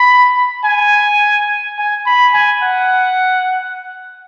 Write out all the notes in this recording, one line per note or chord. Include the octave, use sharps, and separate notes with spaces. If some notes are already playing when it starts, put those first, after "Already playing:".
Already playing: B5
G#5
G#5
B5
G#5
F#5